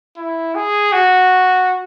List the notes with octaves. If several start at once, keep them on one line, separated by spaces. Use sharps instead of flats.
E4
G#4
F#4